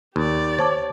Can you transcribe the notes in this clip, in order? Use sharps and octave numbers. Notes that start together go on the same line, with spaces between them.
D#2 G4 D5
C5 C#5 A5 D6